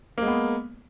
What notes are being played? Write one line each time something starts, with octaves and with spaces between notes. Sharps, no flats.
G#3 A#3 B3